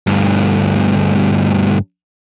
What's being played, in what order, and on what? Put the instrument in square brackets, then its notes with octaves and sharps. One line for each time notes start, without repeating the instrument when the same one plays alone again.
[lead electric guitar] D2 G2